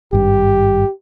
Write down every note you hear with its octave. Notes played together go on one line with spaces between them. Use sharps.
G#1 G2 G4